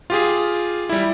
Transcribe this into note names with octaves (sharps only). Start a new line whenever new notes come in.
F4 G4 G#4
G3 E4